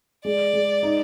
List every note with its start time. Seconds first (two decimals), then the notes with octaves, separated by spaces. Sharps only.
0.25 G#3 D5
0.53 G#3
0.83 D#4